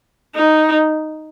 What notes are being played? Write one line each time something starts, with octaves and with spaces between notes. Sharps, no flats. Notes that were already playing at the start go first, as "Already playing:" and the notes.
D#4